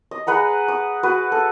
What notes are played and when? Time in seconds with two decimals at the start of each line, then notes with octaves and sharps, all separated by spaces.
0.11 D#5
0.27 G#4 B4 F#5 A#5
0.68 D#6
1.03 F#4 B4
1.32 A4